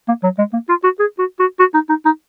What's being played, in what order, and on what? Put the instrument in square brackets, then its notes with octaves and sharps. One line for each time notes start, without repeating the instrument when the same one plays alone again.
[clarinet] A#3
F#3
G#3
A#3
F4
F#4
G#4
F#4
F#4
F#4
D#4
D#4
D#4